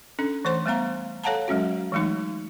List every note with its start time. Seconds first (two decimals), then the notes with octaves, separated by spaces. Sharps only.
0.19 C#4 D4 A4
0.45 E3 A3 C5 C6
0.66 G3 A3 B3 F5 A#5
1.24 A4 C#5 F5 F#5 A5 A#5
1.48 F#3 G#3 C#4 F#4
1.92 E3 F#3 G#3 A3 D#4